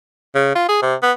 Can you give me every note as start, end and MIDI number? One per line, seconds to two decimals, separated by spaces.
0.35 0.53 49
0.55 0.68 65
0.69 0.79 68
0.82 0.95 48
1.02 1.12 59